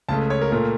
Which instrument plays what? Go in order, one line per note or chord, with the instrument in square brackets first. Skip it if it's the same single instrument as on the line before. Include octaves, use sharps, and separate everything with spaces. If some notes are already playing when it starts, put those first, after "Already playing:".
[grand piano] C#2 C#3 A3 A5
C#5
A#4
A#2 A3 A#4